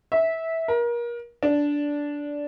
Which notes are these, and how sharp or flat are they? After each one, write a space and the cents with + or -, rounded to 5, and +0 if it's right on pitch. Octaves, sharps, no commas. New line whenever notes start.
E5 -15
A#4 +30
D4 -10